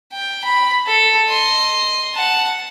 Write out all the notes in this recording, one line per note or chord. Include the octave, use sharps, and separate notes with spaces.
G5
B5
A4
D#5 C6
F#5 A5